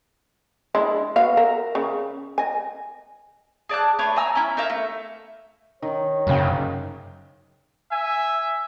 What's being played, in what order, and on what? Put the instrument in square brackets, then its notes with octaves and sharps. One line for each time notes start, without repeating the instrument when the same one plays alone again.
[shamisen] G#3 D4 E4
B3 F#4 F5
A#4 E5
C#3
D#5 G#5
[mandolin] G#4 D5 A5 F#6
A3 D4 B4 C#5
G#5 A#5 E6
C#4 E4
D#4 A#4 E5 F5
A3
[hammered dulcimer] D#3 [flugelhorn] C#5
[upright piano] F#1 C#3 G5 [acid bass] F#2
[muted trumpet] E5 [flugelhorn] G#5